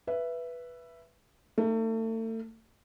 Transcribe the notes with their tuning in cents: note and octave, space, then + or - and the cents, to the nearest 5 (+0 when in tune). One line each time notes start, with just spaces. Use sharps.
B4 -5 E5 +15
A3 +35 D#4 +0